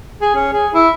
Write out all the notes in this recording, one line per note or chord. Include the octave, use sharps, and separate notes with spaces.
G#4
C#4
G#4
E4